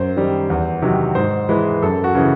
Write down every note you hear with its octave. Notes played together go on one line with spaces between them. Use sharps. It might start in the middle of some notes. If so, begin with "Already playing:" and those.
Already playing: F#2 C5
D#3 G3
E2
C3 D#3 F#3
G#2 C5
E3 G#3 B4
F#2 A4
F#4
C#3 E3